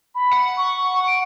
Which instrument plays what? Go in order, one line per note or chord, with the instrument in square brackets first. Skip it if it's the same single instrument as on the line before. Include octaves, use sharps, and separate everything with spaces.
[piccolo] B5
[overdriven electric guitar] F#5
[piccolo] C#6
D7